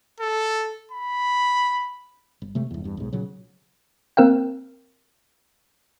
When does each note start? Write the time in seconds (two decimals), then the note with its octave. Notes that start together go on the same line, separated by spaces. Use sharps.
0.20 A4
0.92 B5
2.42 G1
2.55 C3 G#3 A3
2.71 G1 E2
2.84 E2 G2
2.97 B1 G#2
3.12 A#2 C#3 F#3
4.17 A#3 C4 A#4 F5 G5